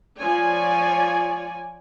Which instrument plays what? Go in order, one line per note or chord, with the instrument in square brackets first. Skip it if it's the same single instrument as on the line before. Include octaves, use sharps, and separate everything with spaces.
[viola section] F3 C#5 D5 G#5